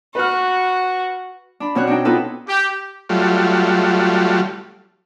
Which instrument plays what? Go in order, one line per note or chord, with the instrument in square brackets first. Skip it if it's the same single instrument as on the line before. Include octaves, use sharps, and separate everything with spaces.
[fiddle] F#4 [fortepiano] B4 F6
[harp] D4 B5
B2 C4 C#4 F#4 C#5 F#6
D4 D#4 G5
B3 C#4 D#4 F4 A4 B4
[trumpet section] G4
[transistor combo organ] F#3 G3 A3 F4